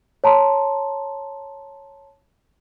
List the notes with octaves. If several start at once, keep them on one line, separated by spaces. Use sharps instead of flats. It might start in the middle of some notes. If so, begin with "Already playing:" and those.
C#5 A5 A#5 C6